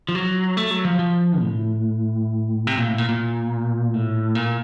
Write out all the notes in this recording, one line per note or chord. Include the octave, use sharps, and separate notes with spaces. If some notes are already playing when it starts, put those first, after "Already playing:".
F3
F#3
A3
F#3
F3
F3
A2
C3
A#2
A2
A#2
A#2
A2
A#2